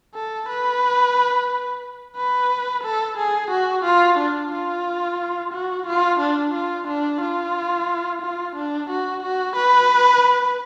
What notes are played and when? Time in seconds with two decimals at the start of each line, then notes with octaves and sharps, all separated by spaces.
0.15 A4
0.48 B4
2.16 B4
2.84 A4
3.18 G#4
3.51 F#4
3.85 F4
4.18 D4
4.52 F4
5.53 F#4
5.86 F4
6.20 D4
6.54 F4
6.88 D4
7.21 F4
8.22 F4
8.56 D4
8.90 F#4
9.23 F#4
9.56 B4